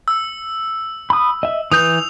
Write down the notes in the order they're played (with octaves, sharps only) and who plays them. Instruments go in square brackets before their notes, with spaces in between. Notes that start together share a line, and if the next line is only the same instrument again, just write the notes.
[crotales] E6
[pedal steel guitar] B5 D#6
D#5 E5
[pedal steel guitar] E3 B4 G6 [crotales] D#6 F7